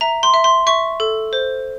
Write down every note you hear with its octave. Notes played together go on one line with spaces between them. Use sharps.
E5 A#5
C6
E5
C6
E5 C#6
A4
C5